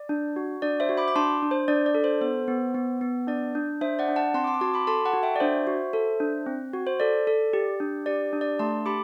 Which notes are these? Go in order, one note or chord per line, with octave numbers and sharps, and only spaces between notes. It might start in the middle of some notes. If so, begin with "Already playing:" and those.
Already playing: D5
D4
F#4
D4 D5
C5 E5
F#4
B5 D6
D6
D4 A5 C6
D4
C5
D4 D5
D5
A4
C5
B3 C5
B3
B3
B3
D4 D5
D4
D4 C5 E5
D5 F#5
D4
F#5 A5
C4 A5 C6
D6
A5 C6
D6
F#4 A5 C6
B5 D6
A4 A5 C6
F#5 A5
F#4
E5 G5
D5
D4 C5 E5
F#4
A4
D4
C4
F#4
C5
A4 D5
A4
G4
D4
G4 D5
D4
D5
A3 A5 C6
G4 B5 D6